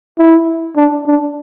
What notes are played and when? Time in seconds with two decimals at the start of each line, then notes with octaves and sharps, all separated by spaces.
0.18 E4
0.76 D4
1.06 D4